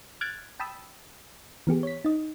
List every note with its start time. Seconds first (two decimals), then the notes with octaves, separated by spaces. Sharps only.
0.21 F6 F#6 G#6 A6 D7
0.60 G5 A5 B5 D#6 E6
1.67 E3 B3 G4 G#4
1.83 C#5 B6
2.05 D#4 D#5